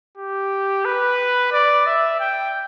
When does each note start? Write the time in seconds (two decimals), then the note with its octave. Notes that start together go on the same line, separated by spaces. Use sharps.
0.18 G4
0.85 B4
1.52 D5
1.87 E5
2.20 G5